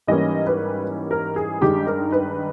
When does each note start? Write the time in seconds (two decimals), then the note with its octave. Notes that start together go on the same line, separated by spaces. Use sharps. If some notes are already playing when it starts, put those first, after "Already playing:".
0.07 G#2 E3 G3 A#3 C#4 D#5
0.47 B4
1.11 A#4
1.36 G#4
1.61 G2 D#3 G#3 G4
1.87 A#4
2.12 B4